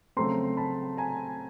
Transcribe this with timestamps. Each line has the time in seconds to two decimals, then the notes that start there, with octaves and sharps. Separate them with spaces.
0.17 C#3 F#3 A3 C4 A#5 C6
0.57 A5 B5
0.97 G#5 A#5